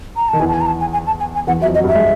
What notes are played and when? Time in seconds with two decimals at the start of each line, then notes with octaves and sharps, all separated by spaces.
0.16 A#5
0.28 D#3 A5
0.39 E2 E3 G#5
0.48 A5
0.54 G#5
0.61 A#5
0.66 A5
0.81 G#5
0.93 G#5
1.07 A5
1.20 G#5
1.35 G#5
1.47 E2 E3 F#5
1.60 F#3 E5
1.66 F2 F3
1.75 F#3 D#5
1.84 G2 G3
1.88 E5
1.95 G#3